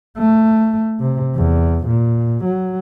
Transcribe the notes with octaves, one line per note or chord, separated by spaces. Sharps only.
A3
C3
E2
A#2
F#3